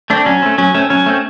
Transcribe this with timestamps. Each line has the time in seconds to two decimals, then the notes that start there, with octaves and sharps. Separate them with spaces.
0.10 A3 C4 D4
0.26 F#3 C#4
0.42 A3 C4
0.58 F#3 C#4
0.74 A3 C4 C#4
0.90 F#3 C#4
1.06 A3 C4